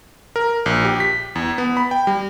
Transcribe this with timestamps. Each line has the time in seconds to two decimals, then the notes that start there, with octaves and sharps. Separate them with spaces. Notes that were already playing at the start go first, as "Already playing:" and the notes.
0.36 A#4
0.66 A#1
0.85 G4
1.00 B6
1.35 E2
1.58 B3
1.77 B5
1.91 G5
2.07 G3